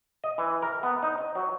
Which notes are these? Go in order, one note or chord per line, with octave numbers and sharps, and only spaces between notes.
D#5
E3
A#4
B3
D#4
D#5
F#3